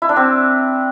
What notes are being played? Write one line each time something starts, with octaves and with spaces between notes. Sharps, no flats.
E4
D4
C4